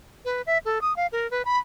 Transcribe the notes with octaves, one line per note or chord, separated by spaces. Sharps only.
B4
E5
A4
D#6
F5
A#4
B4
B5